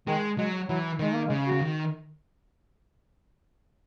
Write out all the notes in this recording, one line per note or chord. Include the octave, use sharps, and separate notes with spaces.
D#3 G#3
F#3 G#3
E3 F#3
D#3 G#3
A#3
G#3
C#3
F#4
C#3
D#3